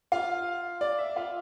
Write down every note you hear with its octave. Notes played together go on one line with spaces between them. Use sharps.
F4 F5
D5
E5
F4 F5